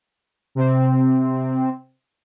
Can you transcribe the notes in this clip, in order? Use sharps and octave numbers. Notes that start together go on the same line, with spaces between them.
C3 C4